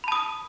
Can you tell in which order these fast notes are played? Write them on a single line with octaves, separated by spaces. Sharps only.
B5 A5 D#6